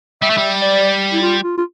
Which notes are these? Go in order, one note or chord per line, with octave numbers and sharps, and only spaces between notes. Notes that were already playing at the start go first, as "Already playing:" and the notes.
G3 E5
A3
G3
D5
E4
F4
F4
F4